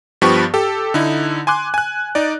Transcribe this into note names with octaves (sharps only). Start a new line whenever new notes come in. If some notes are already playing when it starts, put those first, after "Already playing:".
G2 F3 B3 G4 B4 C#6
G4 A4
D3 D#4 E4
G#5 C6 D6 F#6
G#5 F#6
D#4 D5